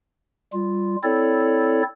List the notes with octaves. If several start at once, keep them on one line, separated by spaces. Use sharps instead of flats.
G3 F4
C4 E4 A4 C#5 D5